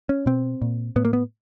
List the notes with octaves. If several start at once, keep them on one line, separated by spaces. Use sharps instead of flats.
C#4
B2 C4
A#2
A2 B3
A#3
B3